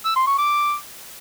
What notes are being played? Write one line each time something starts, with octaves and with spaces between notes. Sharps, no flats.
E6
C6
C#6
D6